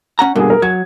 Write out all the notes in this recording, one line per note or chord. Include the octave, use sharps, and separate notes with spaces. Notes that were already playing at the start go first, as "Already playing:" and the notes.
C#4 F#5 A#5
G2 B2 D3 A#3 G#4
A#4
F#3 G#6